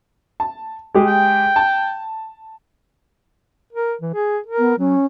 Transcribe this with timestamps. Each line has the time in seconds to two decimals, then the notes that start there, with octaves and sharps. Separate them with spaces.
0.40 A5
0.94 G#3 G4 G#4
1.07 G5
1.56 A5
3.73 A#4
4.01 E3
4.14 G#4
4.46 A#4
4.58 B3
4.78 F#3 C#4